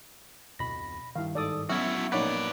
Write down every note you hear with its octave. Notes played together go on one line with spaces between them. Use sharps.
D1 F2 B2 B5 A#6
G2 D#3 E4 F5
G#2 A4 D5 D#6
F#3 B3 C#4 E4 F#4 E5 F6
A#1 A#3 D#4 B4 C#5 D5 F#5 B5